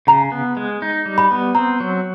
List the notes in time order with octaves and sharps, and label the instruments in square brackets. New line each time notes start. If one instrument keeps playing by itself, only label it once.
[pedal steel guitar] C#3 [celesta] A#5
[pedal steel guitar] B3
G#3
D#4
G3
[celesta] B5
[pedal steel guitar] B3
[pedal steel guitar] C4 [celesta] A#5
[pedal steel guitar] F#3